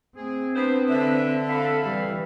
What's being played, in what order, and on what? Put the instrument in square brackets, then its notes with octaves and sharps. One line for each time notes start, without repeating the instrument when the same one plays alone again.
[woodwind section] A3 G#4 [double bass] C4
[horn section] B3 C5 [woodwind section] D4 B4
[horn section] D3 [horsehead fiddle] E5
[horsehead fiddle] A4 [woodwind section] E5 F5 B5
[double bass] E3 [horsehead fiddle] G3